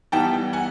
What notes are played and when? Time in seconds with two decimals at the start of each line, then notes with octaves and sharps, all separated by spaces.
0.12 E3 G3 B3 D#4 G5 A5
0.53 F#5 G#5